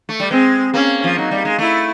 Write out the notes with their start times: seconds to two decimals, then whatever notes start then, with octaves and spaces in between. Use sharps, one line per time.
0.09 A3
0.20 G3
0.30 G#3 C4
0.74 A#3 C#4
1.04 F3
1.16 F#3 D#4
1.31 G3
1.45 G#3
1.59 A3 E4